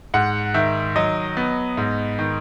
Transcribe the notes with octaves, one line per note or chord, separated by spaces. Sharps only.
G#2 F#5
D#3 E5
F#3 D#5
B3
G#2
D#3